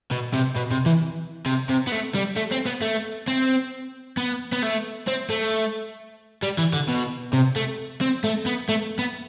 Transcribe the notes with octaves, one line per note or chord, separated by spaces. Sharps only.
B2
C3
B2
C3
E3
C3
C3
B3
A3
G3
A3
C4
B3
A3
C4
B3
B3
A3
C4
A3
G3
E3
D3
B2
C3
A3
C4
A3
B3
A3
B3